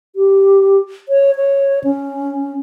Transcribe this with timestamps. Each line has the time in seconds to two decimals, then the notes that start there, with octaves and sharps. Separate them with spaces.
0.16 G4
1.09 C#5
1.36 C#5
1.84 C#4